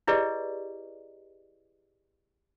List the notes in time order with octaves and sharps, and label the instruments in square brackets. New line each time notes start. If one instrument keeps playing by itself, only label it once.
[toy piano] E4 G4 G#4 B4 D5 D#5